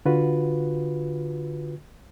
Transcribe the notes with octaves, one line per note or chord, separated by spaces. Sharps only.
D3 F4 F#4 B4